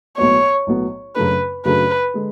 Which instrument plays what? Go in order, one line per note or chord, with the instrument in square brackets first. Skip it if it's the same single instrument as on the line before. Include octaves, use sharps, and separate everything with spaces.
[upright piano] B1 A2 F#3 B3 [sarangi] C#5
[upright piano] B1 A2 F#3 B3
[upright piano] F#2 C#3 F#3 A3 D4 [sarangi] B4
[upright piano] F#2 C#3 F#3 A3 D4 [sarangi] B4
[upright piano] D3 G#3